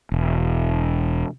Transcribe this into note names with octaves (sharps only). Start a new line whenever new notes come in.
E1